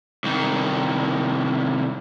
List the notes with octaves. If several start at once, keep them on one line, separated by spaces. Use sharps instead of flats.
C2 D#3